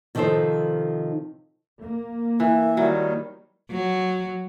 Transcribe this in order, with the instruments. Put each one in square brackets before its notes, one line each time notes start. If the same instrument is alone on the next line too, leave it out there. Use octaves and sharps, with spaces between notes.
[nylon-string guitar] C3 D#3 F3 D#4 A4 C5
[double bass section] A#3
[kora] E3 [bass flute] E5
[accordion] D#3 G3 [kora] F#3
[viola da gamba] F#3